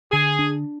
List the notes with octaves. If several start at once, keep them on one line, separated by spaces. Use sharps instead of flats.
D3 G#4
D4